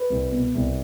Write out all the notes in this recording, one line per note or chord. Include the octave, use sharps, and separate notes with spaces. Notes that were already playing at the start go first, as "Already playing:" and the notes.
Already playing: B4
C2
B2
C2